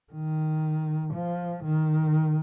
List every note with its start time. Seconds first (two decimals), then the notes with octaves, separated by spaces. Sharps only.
0.13 D#3
1.13 F3
1.64 D#3